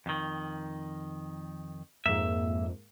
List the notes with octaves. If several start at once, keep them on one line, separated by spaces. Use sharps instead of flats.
F2 D#3
F2 G#2 A#3 E5